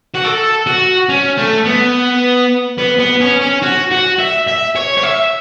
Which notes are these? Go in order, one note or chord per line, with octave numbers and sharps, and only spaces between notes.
F#4
A4
F#4
C#4
A3
B3
B3
B3
C#4
C#4
F#4
F#4
E5
E5
C#5
C#5
E5